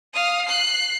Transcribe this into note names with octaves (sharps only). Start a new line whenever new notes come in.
F5 D#6
F#6 C7